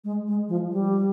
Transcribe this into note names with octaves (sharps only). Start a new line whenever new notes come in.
G#3
G#3
F3
G3